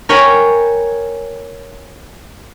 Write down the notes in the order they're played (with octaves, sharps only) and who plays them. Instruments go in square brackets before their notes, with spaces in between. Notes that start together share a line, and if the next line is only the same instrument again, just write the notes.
[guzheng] A#4 C#5 G5 G#5 A#5 B5